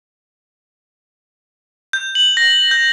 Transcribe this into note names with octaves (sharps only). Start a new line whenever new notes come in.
G6
F#7
A#6
G6